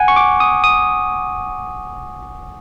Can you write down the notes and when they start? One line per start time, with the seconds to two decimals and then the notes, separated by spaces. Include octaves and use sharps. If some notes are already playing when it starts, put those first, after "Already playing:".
Already playing: F#5 G#5
0.08 C#6
0.16 D6
0.40 D#6
0.64 D#6